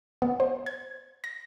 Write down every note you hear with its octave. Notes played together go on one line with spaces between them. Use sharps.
B3
C5
G#6
A#6